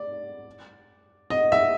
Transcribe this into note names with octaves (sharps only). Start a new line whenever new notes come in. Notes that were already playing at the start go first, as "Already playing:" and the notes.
Already playing: D5
D#5
E5